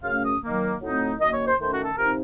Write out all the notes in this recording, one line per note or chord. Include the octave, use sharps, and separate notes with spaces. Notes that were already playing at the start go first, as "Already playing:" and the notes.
F#2 C#3 A3 C#4 F5
D#6
D#3 F#3 A#3
A2 F#3 A3 C4 D#4
F#2 D#3 A#3 D#5
C#5
C5
D#3 A3 C#4 C5
F#4
A4
C3 F3 C4 D#4 A#4